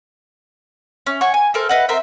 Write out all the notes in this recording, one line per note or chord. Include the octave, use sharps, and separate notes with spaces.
C#4
C#5 F#5 G#5 C#6
G#5
A4 A#4 C5
B4 D#5 F#5
C4 A#4 C5 E5